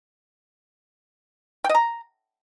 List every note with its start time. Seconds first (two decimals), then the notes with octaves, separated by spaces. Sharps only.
1.64 G5
1.69 D#5
1.75 A#5